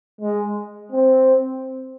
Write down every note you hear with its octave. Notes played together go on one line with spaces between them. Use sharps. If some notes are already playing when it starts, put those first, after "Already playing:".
G#3
C4